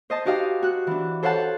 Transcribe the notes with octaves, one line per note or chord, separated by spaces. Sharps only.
C5 D#5 A5
D#4 F#4 G4 D#5 F5
F#4 F#6
E3 D4
A4 C5 C#5 F5 F#5 A5